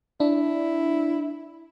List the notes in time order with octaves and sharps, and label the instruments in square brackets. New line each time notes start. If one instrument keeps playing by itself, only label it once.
[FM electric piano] D4 [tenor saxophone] E4